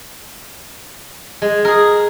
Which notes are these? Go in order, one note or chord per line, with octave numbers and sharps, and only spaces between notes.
G#3
G#4 A#4